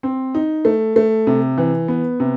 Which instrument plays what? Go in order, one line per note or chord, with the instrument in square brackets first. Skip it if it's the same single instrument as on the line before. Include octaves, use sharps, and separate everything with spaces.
[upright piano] C4
D#4
A3
A3
C3
E3
B3
C3